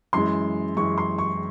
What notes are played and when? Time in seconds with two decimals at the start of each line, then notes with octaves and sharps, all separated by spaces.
0.13 F#2 E3 G#3 C6
0.76 F#2 E3 G#3 C#6
0.98 C6
1.18 C#6